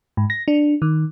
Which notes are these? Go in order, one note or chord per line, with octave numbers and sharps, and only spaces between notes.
G#2
A#6
D4
D#3